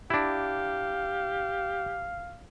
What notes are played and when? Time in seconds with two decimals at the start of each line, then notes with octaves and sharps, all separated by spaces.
0.10 D4 E4 G4 F5